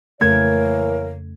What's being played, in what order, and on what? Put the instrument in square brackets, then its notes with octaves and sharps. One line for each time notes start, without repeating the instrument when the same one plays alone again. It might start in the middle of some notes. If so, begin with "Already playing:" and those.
[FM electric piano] F2 C#3 A3 [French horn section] E3 A#3 C#5 [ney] A#4 [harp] G#6